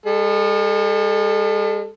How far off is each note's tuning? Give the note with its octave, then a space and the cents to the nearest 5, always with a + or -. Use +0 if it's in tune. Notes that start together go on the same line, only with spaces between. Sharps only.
G#3 -45 A4 +0